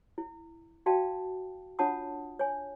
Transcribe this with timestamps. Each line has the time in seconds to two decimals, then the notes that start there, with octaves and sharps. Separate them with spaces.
0.18 E4
0.86 F#4 D5 F5 G5 A5
1.79 D4 F4 C#5 F#5 A5 D#6
2.39 C#5 G#5